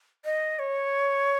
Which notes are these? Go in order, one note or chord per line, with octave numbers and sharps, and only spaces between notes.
D#5
C#5